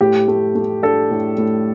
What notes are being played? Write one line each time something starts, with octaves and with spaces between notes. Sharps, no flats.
A2 G4
A3
A3
D4 A4
A2
A2